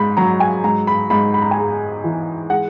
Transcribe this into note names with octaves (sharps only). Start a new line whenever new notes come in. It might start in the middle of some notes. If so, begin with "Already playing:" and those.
Already playing: G#2 B5
F#3 A#5
G#5
G#2 A#5
B5
G#2 B5
B5
A#5
G#5
G#3 A#5
E3
G#3 F#5